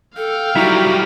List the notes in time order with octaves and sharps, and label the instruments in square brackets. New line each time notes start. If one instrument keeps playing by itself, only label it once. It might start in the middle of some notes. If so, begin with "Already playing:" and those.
[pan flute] A4 [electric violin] F5 G5
[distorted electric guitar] F#3 G3 [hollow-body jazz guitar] D#4 E4 E5 [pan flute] F#4